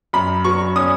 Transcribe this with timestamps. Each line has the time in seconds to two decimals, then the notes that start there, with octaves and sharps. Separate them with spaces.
0.13 F#2 B5
0.44 F#3 C#6
0.76 C#4 D#6